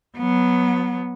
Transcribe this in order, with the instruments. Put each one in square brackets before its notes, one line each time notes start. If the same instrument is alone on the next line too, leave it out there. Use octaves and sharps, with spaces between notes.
[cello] F#3 B3